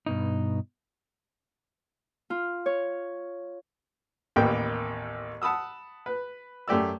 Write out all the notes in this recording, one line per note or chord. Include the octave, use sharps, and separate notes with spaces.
G2 B2 D#4
F4
C#5
A1 D#2 A#3 B3 G4 G5
F#5 A5 B5 D#6 E6
B4
F#2 A3 G4 D5 E6